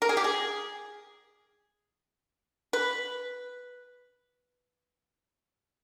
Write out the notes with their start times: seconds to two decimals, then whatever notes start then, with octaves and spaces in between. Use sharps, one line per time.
0.02 A#4
0.09 G#4
0.17 G4
0.24 G#4
2.73 B4